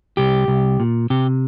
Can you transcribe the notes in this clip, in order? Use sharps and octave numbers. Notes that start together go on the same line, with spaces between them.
C2 G4
C2
A#2
C3 G4